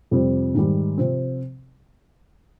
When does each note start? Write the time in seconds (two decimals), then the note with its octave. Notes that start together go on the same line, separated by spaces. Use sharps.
0.11 F2 C3 G3 C4
0.55 G#2 D#3 G3
0.97 C3 F3 C4